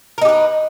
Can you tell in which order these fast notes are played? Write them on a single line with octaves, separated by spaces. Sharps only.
A#4 D#4 G4 B4